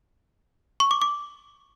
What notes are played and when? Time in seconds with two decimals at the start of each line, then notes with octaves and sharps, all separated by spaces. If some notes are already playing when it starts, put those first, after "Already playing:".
0.80 C#6
0.91 D6
1.02 D6